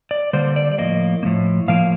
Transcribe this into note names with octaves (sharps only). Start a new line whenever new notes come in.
D5
D3 G3 A#3 C5
D5
D5
A2 F3 A#3 D#5
A2 F3 A#3
A2 F3 A#3 F5